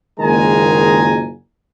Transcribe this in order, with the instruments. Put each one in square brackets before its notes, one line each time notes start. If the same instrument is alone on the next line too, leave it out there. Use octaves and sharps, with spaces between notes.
[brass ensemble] F#1 A#2 D#3 G#3 G#5 A#5